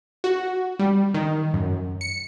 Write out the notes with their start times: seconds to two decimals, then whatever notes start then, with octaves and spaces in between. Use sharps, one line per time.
0.24 F#4
0.79 G3
1.14 D#3
1.54 F#2
2.01 C#7